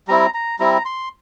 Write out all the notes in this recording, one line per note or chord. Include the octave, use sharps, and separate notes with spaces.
G3 C4 E4 A#5
A#5
G3 C4 E4 A#5
C6